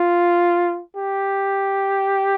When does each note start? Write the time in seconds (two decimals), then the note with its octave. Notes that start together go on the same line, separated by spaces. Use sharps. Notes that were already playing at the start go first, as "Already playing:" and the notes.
Already playing: F4
0.96 G4